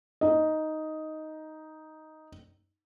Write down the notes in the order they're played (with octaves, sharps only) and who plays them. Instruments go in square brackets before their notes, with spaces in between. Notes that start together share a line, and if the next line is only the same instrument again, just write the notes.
[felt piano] D#4 D#5